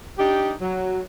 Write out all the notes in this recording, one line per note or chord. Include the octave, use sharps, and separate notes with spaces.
D4 D#4 G4
F#3